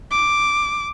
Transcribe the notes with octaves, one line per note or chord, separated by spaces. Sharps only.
D6